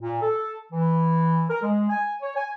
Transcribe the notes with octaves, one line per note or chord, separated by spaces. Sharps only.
A#2
A4
E3
A#4
G#3
G#5
C#5
G#5